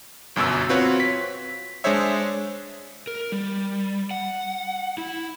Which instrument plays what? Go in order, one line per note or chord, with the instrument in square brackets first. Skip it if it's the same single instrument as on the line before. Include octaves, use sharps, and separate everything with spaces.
[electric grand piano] G1 F#2 B2 F#3 E6
C4 F4 F#4 B4 C#5
B6
G#3 D4 G#4 C5 C#5 E5
[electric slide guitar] A#4
G3
F#5
E4